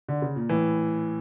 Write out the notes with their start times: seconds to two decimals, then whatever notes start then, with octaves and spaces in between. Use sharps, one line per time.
0.09 D3
0.22 C#3
0.36 A#2
0.49 A2 E3